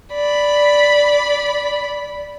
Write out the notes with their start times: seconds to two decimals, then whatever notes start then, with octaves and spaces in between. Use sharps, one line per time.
0.13 D5 B5